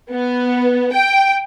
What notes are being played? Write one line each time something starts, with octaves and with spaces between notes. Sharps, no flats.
B3
G5